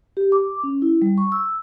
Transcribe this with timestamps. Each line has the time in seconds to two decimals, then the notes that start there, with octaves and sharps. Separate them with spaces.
0.17 G4
0.32 D6
0.63 C#4
0.82 E4
1.02 G3
1.18 C#6
1.32 E6